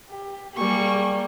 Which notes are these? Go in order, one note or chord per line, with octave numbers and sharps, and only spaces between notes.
G4
G3 A#3 G#4 C#6